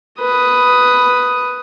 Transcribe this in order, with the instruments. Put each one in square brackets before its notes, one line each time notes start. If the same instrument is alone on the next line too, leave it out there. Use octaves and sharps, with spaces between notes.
[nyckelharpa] B4 D#6